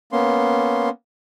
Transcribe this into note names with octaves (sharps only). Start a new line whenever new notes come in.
A#3 B3 C#4 C6